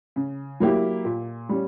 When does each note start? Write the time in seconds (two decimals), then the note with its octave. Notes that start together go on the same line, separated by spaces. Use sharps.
0.16 C#3
0.60 F#3 A#3 E4 G4
1.05 A#2
1.49 G3 C#4